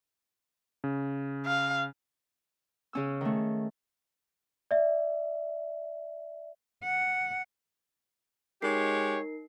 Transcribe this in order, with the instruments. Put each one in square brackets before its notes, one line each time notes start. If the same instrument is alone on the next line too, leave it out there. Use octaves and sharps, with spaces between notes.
[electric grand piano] C#3
[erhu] F5
[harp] C#3 C#4 E6
D#3 A3
[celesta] D5 E5
[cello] F#5
[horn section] G#3 G4 C#5 [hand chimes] D#4 A#4 C7